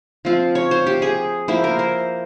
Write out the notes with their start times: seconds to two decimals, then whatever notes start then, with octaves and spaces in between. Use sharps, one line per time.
0.25 F3 C4 F4
0.55 C#5
0.71 C5
0.87 G4
1.02 G#4
1.48 F3 A#3 E4 C5
1.64 A#4
1.79 C5